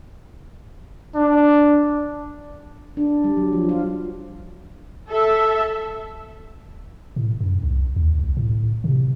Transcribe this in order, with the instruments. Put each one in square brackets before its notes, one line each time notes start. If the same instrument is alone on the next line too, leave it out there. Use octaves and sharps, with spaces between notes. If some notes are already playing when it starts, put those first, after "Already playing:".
[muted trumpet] D4
[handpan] D4
G3
F#3
F3
F4
[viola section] A4 E5
[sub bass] A2
F#2
C2
D#2
C2
A2
C3